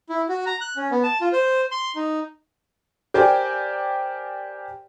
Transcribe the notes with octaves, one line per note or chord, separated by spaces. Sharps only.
E4
F#4
A#5
F#6
C#4
B3
A5
F4
C5
C6
D#4
G4 A#4 C5 D5 G5 G#5